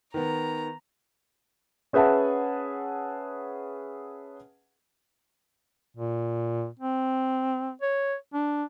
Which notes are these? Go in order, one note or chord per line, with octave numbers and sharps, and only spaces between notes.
D#3 B3 A#5
C#4 G#4 B4 E5 F#5 A5
A#2
C4
C#5
D4